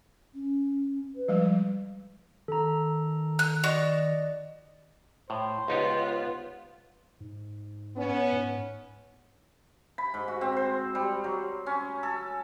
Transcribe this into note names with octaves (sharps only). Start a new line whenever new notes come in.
C#4
B4
F3 G3 G#3
D#3 A4 A#5
F#6
F#4 D5 D#5
A2 C5
C#2 B3 D#4 F4 G4
G#2
B3 C#4
G#2
B5
G#2
F#4
C4
C5
G3
F#3
C#4
A4